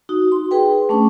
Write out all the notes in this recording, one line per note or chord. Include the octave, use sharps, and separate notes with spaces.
D#4 F#4
C6
G#4 B4 G5
A3 C#4 D4 C#6